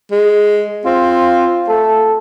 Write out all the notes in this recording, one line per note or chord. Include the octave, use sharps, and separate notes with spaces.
G#3
C4 F4
A3 A4